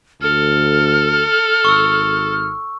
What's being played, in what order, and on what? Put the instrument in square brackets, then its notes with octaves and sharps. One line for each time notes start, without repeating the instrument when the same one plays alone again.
[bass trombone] D2 [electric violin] A4 [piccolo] F6
[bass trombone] G#1 [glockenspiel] C#6 E6